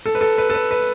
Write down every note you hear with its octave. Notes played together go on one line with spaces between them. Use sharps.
A4
B4
A4
B4
A4
B4
B4